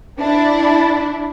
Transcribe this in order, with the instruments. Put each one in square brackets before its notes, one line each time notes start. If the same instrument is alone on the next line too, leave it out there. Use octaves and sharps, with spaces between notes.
[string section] D4 E4